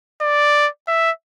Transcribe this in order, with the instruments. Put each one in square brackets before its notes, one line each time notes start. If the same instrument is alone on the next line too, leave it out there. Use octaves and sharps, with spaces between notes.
[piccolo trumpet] D5
E5